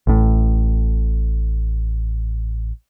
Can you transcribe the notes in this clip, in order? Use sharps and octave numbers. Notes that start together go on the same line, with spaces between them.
A1 A2